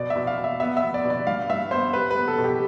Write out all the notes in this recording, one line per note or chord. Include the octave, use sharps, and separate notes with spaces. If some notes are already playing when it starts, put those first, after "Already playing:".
Already playing: B2 D5
E5
B2
F5
B2
E5
B3 E5
E5
B3
D5
B2
D5
G2 F5
G2 E5
B3 C5
G3 B4
B4
B3
A4
B2
G4